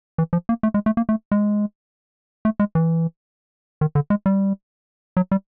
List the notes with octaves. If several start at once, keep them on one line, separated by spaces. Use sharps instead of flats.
E3
F3
A#3
A3
G#3
A3
A#3
A3
G#3
A3
G#3
E3
D#3
D3
G#3
G3
F#3
G3